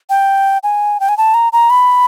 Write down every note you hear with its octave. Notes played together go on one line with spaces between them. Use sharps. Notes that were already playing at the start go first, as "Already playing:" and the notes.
G5
G#5
G5
G#5
A5
A#5
A#5
B5